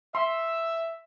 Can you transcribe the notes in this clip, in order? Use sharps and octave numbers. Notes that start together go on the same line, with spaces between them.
E5 C6